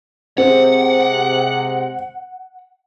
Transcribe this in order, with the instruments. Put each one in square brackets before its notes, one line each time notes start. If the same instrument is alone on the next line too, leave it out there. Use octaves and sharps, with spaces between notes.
[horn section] C3 G#3 [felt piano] C4 [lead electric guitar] F#5